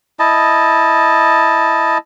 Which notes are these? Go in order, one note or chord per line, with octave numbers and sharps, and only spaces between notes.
E4 D#5 A5